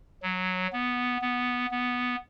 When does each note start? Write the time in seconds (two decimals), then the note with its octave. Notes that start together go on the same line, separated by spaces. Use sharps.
0.22 F#3
0.73 B3
1.21 B3
1.71 B3